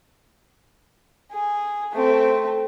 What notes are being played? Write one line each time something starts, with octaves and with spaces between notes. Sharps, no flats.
G#4
A3 C4